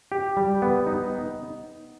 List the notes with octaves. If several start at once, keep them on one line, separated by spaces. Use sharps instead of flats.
G4
G3
B3
D#4